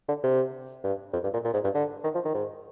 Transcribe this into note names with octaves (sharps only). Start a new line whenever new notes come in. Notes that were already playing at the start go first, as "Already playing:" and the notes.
D3
C3
G2
F2
G2
A#2
A#2
G#2
G2
D3
D#3
F3
D#3
G#2